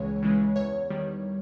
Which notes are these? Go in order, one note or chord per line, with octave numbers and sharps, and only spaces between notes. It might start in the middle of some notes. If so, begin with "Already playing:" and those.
Already playing: C#2 C#3 E3 G#3 C#5
C#3 E3 G#3
E2 C#5
D#3 G3